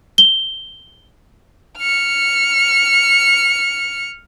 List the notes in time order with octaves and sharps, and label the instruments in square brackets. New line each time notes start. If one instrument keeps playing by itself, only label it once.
[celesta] G7
[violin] F6 C#7